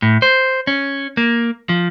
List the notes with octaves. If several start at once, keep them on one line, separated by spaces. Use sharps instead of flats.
A2
C5
C#4
A#3
F3